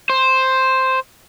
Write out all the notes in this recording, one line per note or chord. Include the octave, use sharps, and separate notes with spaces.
C5